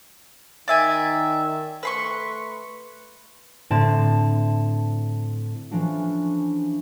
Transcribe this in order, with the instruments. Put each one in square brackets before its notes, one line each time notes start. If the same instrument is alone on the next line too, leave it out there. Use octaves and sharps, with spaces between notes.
[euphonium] D#3 [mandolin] D5 E5 G#5
[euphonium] A3 [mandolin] B4 C6 C#6
[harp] A2 D3 C4 A5
E3 F3 A3 C#4 D4 F#4